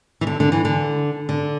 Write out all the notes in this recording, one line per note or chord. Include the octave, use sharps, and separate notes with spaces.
E3
D3
D3
E3
D3
D3